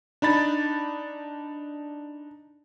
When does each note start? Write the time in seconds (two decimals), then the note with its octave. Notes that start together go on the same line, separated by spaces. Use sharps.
0.22 D4 D#4 B5 A6